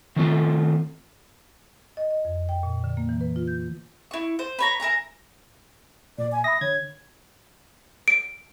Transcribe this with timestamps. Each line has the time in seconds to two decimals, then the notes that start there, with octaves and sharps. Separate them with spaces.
0.16 D#3 F#3 A3 C4 F4 A4
1.97 D#5
2.11 D#5
2.25 F2
2.49 G5
2.63 A#2
2.84 D3
2.97 A#3
3.09 E3
3.21 B4
3.36 F4
3.47 G6
4.11 E4 C#6
4.39 C5
4.59 B4 C#5 A#5
4.80 E4 A#4 G#5 A#5
6.18 A#2 D5
6.32 G#5
6.44 E5 B5 D#6 A#6
6.61 D3 C#5 G#6
8.08 D7